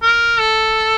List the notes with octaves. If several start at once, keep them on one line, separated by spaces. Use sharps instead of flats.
A#4
A4